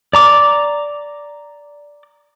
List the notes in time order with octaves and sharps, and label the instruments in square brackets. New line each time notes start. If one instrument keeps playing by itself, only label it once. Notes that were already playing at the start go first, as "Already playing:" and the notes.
[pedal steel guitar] D5 A#5 D6